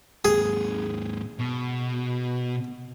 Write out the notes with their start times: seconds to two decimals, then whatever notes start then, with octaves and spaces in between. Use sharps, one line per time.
0.25 D#2 G#2 G#4
1.40 B2